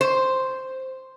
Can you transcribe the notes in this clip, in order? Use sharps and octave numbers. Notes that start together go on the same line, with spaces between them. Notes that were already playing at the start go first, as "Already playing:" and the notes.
C5